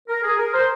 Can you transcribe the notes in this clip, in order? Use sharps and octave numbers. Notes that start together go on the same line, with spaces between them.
A#4
G#4
A#4
C5